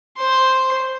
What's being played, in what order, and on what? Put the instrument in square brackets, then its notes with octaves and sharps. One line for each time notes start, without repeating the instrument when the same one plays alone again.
[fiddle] C5 C6